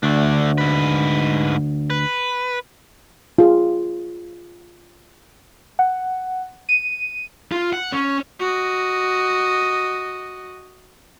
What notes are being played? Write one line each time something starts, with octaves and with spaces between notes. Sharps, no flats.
D2 A3 D4
G#2 B4
B4
F4 G#4
F#5
D#7
F4
F#5
C#4
F#4 D#5